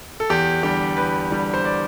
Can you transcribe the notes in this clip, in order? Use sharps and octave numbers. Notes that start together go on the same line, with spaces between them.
A4
E2 G4
D3 G3 G4
E2 B4
D3 G3
C5
D5